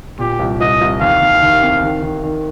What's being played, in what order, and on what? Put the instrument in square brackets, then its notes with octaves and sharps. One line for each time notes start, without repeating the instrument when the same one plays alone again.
[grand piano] A#2 [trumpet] G4
[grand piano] C2
[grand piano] C2 [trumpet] D#5
[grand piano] C2
[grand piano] D#2 [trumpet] F5
[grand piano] D#2
D#3
C4
D#3
D#3
D#3